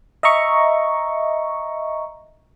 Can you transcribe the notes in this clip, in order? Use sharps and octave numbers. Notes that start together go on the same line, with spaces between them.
D#5 E5 A#5 C#6